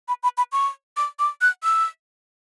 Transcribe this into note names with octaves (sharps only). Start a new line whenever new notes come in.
B5
B5
B5
C#6
D6
D6
F#6
E6